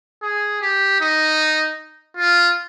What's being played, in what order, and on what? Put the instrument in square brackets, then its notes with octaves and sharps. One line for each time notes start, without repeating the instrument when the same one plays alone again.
[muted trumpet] G#4
G4
D#4
F4